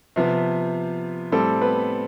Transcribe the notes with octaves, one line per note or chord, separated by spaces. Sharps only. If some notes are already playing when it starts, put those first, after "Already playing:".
C3 F3 B3
A2 G3 C4 A4
B3 B4